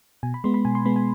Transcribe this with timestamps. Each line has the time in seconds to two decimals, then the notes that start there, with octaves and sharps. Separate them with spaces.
0.23 B2 G#5
0.34 B5
0.44 G#3 B3 C6
0.54 B5
0.65 B2 G#5
0.75 C6
0.86 G#3 B3 B5
0.96 G#5